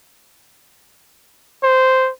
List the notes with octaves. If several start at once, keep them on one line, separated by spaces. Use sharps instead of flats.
C5